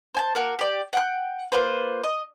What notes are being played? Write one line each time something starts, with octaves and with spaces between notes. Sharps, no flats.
C5 G#5 A5
A#3 F#4 A#4
G4 D5
F#5 G5 F#6
A#3 F4 B4 C5
D#5